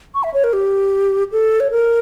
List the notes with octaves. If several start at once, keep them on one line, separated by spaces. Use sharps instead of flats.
C#6
E5
C#5
A#4
G4
A4
C#5
A#4